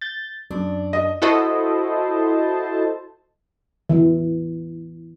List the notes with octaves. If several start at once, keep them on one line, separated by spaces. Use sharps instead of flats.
G6 A6
F#2 D4
D#5
E4 F#4 A4 C5 D#5 A5
E3